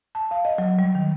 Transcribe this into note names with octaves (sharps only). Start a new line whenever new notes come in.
A5
F5
D#5
F#3
G3
D#3